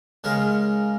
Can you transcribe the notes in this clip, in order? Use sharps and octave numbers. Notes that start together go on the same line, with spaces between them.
C#3 G#3 A#4